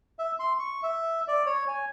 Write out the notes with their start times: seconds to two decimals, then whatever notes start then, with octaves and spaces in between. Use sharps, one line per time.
0.19 E5
0.39 C6
0.59 C#6
0.83 E5
1.28 D5
1.46 C#5
1.68 G#5